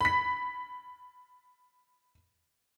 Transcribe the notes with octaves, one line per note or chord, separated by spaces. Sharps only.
B5 B6